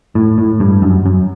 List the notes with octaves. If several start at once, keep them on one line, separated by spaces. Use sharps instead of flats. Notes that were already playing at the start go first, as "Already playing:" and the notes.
A2
A2
G2
F#2
F#2